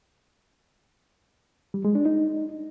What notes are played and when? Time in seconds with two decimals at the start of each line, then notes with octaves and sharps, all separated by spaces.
1.74 G3
1.85 G#3
1.95 D4
2.06 D#4